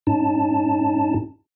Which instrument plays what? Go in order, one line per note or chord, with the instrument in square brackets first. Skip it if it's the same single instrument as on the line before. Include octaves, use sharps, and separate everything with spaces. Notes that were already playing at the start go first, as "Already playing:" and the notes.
[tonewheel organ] G#2 C#4 D#4 A5